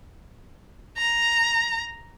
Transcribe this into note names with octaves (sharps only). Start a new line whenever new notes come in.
A#5